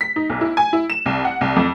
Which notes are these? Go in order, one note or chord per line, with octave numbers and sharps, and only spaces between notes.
B6
D#4
B1
E4
G#5
E4
E7
C2
F#5
C2
F2